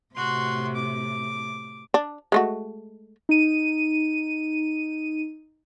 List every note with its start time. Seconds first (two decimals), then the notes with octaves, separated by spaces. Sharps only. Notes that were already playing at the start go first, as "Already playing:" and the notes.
0.15 A2 C3 F#4 C6
0.75 D6
1.94 D4
2.32 G#3 A3 F#4
3.29 D#4 D#7